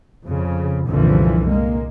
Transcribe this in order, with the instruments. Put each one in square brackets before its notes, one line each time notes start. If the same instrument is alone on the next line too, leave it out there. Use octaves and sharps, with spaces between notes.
[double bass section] F2 C#3
C2 F#2 A#2 D3 E3 F3
G#3 A#3